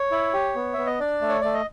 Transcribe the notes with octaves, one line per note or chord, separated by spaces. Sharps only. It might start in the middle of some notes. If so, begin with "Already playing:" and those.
Already playing: C#5
E4
G4
B3
B3 E5
D#5
D4 D5
A3
C#5
A3 D5
D#5